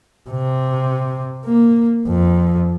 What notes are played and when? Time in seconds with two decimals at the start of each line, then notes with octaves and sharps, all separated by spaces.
0.30 C3
1.45 A#3
2.07 F2